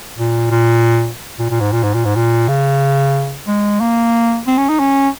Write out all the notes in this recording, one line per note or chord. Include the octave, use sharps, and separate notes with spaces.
A#2
A#2
A#2
A#2
G#2
A#2
G#2
A#2
G#2
A#2
C#3
G#3
A#3
C4
C#4
D#4
C#4